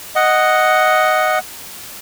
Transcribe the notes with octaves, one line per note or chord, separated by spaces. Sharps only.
D#5 F#5